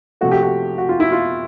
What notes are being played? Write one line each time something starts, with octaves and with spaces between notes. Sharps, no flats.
C2 C3 F3 A3 F#4
G4
F#4
F#4
F4
E4
F4